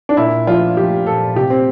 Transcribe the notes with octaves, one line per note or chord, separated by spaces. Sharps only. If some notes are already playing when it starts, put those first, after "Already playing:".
D4
A#2 E4
F3 F4
F3 G4
A#2 A4
C3 G4
C4